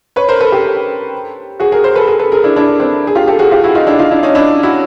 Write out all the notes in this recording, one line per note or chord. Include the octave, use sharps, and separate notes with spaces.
B4 C#5
A#4 C5
A4 B4
G4 A4
F#4 G#4
G#4 A#4
A#4 C5
A4 B4
G#4 A#4
A4 B4
G#4 A#4
D4 E4
D4 E4
C4 D4
G#4
F4 G4
G4 A4
F#4 G#4
F4 G4
E4 F#4
D#4 F4
D4 E4
D#4 F4
D4 E4
C#4 D#4
D4 E4
E4 F#4